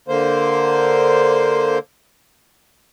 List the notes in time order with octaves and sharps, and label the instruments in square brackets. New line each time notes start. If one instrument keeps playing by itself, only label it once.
[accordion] D3 A#3 C5